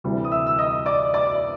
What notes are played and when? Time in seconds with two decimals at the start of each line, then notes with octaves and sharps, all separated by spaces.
0.04 D2 C3 E3 G3
0.24 D#6
0.31 E5 E6
0.47 E6
0.58 D#5 D#6
0.86 D5 D6
1.14 D5 D6